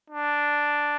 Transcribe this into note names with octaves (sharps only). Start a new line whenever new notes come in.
D4